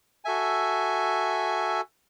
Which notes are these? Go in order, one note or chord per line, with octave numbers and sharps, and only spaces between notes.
F#4 A4 E5 G#5